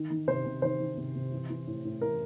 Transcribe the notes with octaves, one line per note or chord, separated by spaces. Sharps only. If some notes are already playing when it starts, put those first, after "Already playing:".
Already playing: D#3
D#3
C3 C5
C3
D#3 C5
D#3
C3
C3
E3
E3
A2
A2
E3 A#4